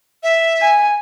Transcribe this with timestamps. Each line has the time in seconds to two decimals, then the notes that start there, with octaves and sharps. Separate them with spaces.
0.23 E5
0.62 G#5